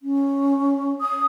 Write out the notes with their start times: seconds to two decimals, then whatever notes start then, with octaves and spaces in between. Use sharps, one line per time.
0.01 C#4
1.01 D#6